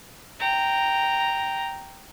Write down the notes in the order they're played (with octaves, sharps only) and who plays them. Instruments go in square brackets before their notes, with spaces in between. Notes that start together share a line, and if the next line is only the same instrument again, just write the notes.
[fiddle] G5 A#5